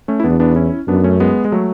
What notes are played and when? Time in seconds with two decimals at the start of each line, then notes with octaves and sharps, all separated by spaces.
0.08 A3 C#4
0.20 E4
0.24 E2 B3 D4
0.40 B3 D4
0.56 C#4 E4
0.88 F#2 B3 D4
1.04 A3 C#4
1.20 G#3 B3
1.45 G#3
1.52 F#3 A3